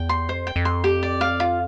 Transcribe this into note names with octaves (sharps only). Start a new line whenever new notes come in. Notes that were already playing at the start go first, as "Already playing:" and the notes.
Already playing: E2 G5
C6
F2 C5
G5
F2
C6
G4
D5
F5
F4